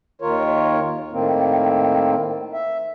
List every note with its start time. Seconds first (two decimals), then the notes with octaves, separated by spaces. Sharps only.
0.22 D#2 D#3 F4 A#4 C#5
1.12 A2 D#3 A#3 C4
2.54 E5